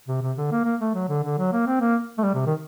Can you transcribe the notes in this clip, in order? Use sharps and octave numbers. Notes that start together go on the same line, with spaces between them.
C3
C3
D3
A#3
A#3
A3
F#3
D3
D3
F#3
A#3
C4
A#3
A3
G3
C3
D#3